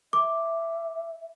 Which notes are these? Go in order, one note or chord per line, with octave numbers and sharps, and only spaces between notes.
E5 D6